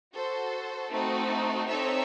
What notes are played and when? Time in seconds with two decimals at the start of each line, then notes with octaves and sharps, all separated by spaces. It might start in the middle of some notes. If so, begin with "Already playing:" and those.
0.13 F#4 A4 C5
0.90 A3 C4 D#4 F#4
1.67 C4 D#4 A4 C#5 E5